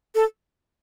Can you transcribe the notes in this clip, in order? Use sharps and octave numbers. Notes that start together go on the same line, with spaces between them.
A4